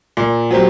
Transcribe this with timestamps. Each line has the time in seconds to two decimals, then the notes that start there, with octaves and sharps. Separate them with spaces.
0.17 A#2
0.51 F#3 C4 G4